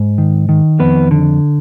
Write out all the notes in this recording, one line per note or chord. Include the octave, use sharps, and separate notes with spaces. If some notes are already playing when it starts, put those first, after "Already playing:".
Already playing: G#2
D#3
D#3
F2 B3 B4
D3